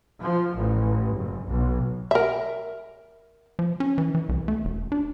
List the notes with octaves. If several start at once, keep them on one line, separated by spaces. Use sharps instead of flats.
F3
A1
F#1
B1
A#4 E5
F3
C#4
E3
E3
C2
A3
E1
D4